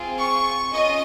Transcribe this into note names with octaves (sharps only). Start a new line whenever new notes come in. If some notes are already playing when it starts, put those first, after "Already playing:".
Already playing: C4 F4 G#4
C#6
C#4 F4 D#5